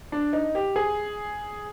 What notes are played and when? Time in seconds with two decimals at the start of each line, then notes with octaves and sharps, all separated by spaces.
0.12 D4
0.33 D#4
0.55 G4
0.76 G#4